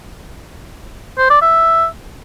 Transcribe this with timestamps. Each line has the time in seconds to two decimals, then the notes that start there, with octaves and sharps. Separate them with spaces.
1.18 C5
1.30 D5
1.42 E5